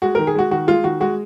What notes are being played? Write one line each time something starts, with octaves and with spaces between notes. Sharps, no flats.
G#3 F#4
D#3 A#4
G#4
G#3 F#4
D#3 F#4
G#3 F4
D#3 F#4
G#3 F#4